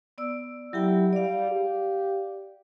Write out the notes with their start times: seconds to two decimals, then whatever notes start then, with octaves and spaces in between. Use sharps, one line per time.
0.18 B3 D5 E6
0.73 F#3 E4 G4 G5
1.13 G3 D5 F5
1.52 G4